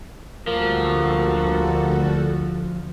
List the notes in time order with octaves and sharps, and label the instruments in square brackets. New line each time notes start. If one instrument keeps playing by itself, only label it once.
[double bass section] D2 [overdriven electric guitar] F3 [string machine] G3 F#4 A4 [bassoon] A#3